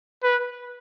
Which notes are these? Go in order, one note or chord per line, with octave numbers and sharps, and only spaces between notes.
B4